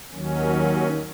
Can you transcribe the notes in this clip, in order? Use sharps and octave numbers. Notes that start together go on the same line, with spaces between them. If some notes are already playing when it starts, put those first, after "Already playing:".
D#2 D#3 F#3 C#4